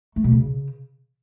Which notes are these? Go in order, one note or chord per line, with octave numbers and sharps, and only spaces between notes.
A3
B2
C#3